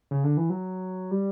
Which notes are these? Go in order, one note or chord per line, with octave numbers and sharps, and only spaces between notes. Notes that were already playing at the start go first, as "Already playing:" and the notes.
C#3
D3
E3
F#3
G3